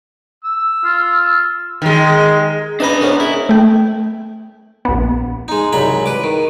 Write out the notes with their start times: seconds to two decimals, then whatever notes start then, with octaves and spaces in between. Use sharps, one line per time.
0.45 E6
0.84 F4
1.82 D#3 G#3
2.80 C#4 D4 B4 D#5 G#5 A#5 B5
3.01 G#3 B3 C#4 A#4 C5
3.20 E4 G#4
3.49 A3 G5
4.85 A#1 B3
5.48 G#3 D#4
5.73 C2 G#2 F#3 A#5 B5
6.06 B4 D6
6.24 D#3